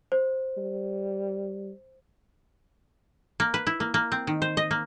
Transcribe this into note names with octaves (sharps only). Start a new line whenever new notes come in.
C5
G3
A#3
B4
E4
A#3
A#3
C4
D#3
C5
D#5
A#3